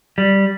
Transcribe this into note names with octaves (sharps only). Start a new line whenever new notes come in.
G3